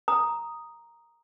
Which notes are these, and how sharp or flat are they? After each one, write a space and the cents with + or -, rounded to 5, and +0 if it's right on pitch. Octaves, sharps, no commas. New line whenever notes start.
A#5 +0 D#6 +0